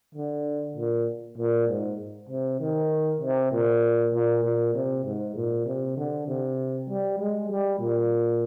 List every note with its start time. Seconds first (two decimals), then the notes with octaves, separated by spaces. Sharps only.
0.15 D3
0.77 A#2
1.38 A#2
1.68 G#2
2.29 C3
2.60 D#3
3.21 C3
3.52 A#2
4.14 A#2
4.44 A#2
4.74 C3
5.05 G#2
5.36 A#2
5.66 C3
5.97 D3
6.28 C3
6.88 G3
7.19 G#3
7.50 G3
7.80 A#2